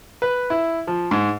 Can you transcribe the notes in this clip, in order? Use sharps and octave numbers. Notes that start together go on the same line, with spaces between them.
B4
E4
F3
G#2